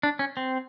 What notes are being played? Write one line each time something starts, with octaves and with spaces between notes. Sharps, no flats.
D4
C#4
C4